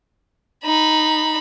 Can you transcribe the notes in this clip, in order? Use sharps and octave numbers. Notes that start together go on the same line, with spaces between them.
D#4 B5